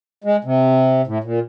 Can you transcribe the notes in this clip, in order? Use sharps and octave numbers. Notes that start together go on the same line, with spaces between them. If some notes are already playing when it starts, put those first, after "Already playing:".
G#3
C3
A2
A#2